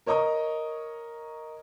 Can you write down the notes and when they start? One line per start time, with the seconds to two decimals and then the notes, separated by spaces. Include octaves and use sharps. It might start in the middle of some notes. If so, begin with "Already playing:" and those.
0.06 A#4 C#5 D#5 A#5 C#6 D#6